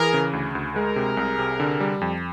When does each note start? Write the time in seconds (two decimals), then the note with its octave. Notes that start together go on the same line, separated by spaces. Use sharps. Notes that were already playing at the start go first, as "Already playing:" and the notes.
Already playing: E3 G#4 A#4
0.14 C#3
0.33 D2
0.55 D2
0.75 G#3 G#4 A#4
0.96 C3
1.17 C2
1.39 C3
1.60 D3
1.81 G3
2.01 F2